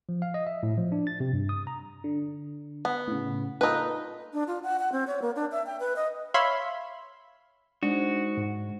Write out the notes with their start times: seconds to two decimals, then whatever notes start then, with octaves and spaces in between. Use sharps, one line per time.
0.09 F3
0.22 F5
0.34 D#5
0.47 E5
0.63 A2
0.78 F3
0.92 D4
1.07 A6
1.20 C3
1.33 G2
1.49 D#6
1.67 A#5
2.04 D3
2.85 B3
3.08 A2 C#3
3.61 A#3 D#4 F4 A4 B4
4.33 D4
4.47 F4
4.63 F#5
4.79 F#5
4.92 C4
5.07 C#5
5.22 A#3
5.36 D4
5.52 E5
5.66 G5
5.80 B4
5.96 D#5
6.34 C#5 E5 F5 B5 C6
7.83 G#3 D4 D#4 F#4 C5
8.37 G#2